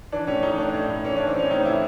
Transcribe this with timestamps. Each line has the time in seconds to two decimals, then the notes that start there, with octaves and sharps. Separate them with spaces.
0.12 E3 D4
0.27 A2 C#4
0.43 E3 D#4
0.58 A2 D4
0.74 A2
0.89 A2
1.04 E3 C#4
1.16 E3 D4
1.27 C4
1.36 E3 C#4
1.50 A2 D#4
1.66 E3 E4